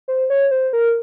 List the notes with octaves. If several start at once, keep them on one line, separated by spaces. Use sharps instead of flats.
C5
C#5
C5
A#4